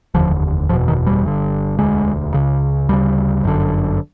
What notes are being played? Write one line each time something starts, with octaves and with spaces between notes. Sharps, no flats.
F1 D#2 D3 F3
F#1 E2 B2 F3
D#3
G3
G1 G2 D3
E1 D2 D3 G#3
C#2 C#3
D2 C#3 G3
G1 F#2 D3